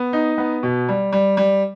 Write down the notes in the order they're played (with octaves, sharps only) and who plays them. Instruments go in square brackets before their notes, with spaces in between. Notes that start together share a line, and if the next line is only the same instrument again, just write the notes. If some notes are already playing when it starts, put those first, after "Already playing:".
Already playing: [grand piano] B3
D#4
B3
B2
G3
G3
G3